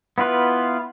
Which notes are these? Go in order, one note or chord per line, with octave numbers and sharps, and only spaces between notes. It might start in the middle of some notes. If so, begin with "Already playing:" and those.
B3 E4 F4 B4